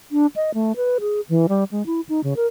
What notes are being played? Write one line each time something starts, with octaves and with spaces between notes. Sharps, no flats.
D4
D#5
A3
B4
G#4
E3
G3
G#3
E4
D#4
C#3
A#4